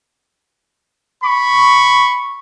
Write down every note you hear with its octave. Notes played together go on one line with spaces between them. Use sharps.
B5 C#6